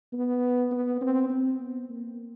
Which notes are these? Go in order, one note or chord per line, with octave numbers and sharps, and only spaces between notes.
B3
B3
C4
C4
B3
A#3